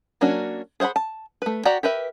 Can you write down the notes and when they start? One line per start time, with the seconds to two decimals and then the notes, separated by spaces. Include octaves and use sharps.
0.21 F#3 A#3 C#4 D4 F#4
0.80 G#4 C5 F5 F#5 B5
0.96 A5
1.42 A3 B4
1.65 F#4 G4 D5 F#5 A#5
1.83 G4 A#4 B4 E5